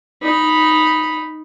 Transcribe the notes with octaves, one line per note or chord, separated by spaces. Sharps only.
D#4 B5